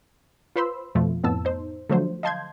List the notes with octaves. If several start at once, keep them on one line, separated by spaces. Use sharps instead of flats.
F4 B4 C5 B5 C6 E6
F2 B2 F3 A3 F4
F2 A2 B3 A5 E6
D#4 C5
D3 F3 F#3 A3 C5
D#5 F5 A5 C6 G6 G#6